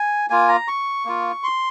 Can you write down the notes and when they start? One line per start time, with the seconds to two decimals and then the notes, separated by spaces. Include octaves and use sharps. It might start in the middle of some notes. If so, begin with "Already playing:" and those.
Already playing: G#5
0.30 A#3 F4 G#5
0.49 A#5
0.68 C#6
1.05 A#3 F4
1.44 C6